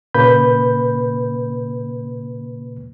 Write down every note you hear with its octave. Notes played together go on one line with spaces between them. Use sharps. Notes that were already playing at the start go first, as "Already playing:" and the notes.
A#2 C#3 A#3 B4 B5 G6